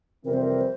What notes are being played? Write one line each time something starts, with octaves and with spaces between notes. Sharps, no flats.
F2 C3 E3 G3 C4 A#4
C5
A#4
C5